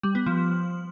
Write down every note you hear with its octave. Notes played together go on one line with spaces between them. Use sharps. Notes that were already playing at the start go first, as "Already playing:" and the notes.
G3
B3
F3